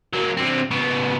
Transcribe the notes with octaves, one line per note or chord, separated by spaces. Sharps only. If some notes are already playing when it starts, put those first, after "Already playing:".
F#3 A#3
D3 C4
C#3 B3